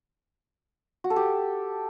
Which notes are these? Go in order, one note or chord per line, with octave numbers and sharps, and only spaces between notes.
F#4
A4
G4